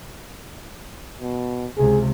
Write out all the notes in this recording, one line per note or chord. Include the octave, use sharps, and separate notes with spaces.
B2
C#2 C3 G#4